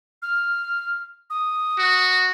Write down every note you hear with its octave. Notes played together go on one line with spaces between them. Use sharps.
F6
D#6
F#4